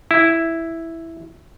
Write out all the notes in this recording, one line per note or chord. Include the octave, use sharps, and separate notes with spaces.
E4